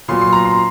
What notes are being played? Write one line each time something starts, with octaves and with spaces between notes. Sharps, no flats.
A#2 F#3 B3 C6
C6
A#5
C6